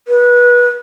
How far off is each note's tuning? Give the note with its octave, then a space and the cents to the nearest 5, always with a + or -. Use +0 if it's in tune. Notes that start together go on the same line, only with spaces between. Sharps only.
B4 -25